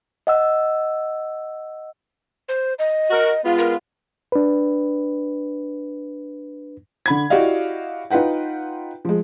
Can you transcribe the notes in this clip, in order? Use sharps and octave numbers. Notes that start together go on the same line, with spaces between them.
D#5 F#5 E6
C5
D#5
F#4 A#4
G#3 B3 F4
A#4
D4 B4
D3 B5 G#6
E4 F#4 G4 D5 D#5 F5
D#4 F4 B4 F#5 G5
F3 G#3